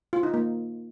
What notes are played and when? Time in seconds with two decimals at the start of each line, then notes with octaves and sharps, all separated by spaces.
0.13 F4
0.23 D#4
0.34 A#3